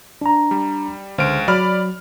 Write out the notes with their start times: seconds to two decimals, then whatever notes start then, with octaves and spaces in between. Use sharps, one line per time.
0.21 D4 A#5
0.51 G3
1.18 C#2 D3 C5 F6 D7
1.48 F#3 D5 B5 F6